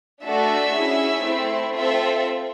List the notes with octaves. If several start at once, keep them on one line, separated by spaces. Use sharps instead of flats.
A3 D4 F#4 A4 E5
C#4 E4 G#4
A3 C4 E4
C4 F4 A4 E5